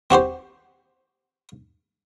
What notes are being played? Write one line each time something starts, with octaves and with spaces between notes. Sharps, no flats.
C4 F#4 G4 C5